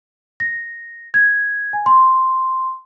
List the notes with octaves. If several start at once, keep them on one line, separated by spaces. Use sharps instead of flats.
A#6
G#6
G#5
C6